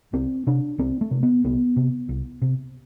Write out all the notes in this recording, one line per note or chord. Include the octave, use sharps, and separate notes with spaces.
C2 C4
C3 D4
C2 C4
A3
C3
B3
C2 B3
C3
C2
C3